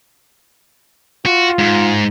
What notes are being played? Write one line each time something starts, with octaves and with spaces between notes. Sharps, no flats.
F4 F#4
G#2